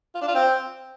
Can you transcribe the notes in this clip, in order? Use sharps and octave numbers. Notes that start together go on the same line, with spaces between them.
F4
D4
F4
C4